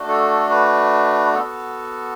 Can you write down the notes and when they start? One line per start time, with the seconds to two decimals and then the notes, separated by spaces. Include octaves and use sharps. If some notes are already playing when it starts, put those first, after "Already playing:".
Already playing: A3 D4 F#4
0.08 A4
0.50 B4
1.34 B3 F#4 A4